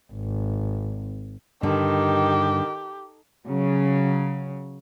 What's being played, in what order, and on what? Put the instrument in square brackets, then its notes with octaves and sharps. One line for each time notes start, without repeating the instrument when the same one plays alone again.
[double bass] G#1
[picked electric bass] G2 [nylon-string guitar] D3 [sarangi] D#3 [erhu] G4
[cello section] C#3 F#3